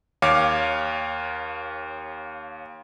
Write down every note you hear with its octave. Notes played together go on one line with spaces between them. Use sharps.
D#2 C#5 F5 D6